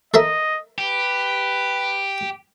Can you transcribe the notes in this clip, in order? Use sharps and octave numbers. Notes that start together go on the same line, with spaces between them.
A4 A#4 D#5 E5
G4 B4